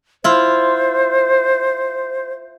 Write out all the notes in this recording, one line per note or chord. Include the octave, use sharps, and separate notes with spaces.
E4 F4 C5